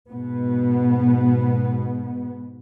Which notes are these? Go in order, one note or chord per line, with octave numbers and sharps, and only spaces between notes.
G#2 B2 B3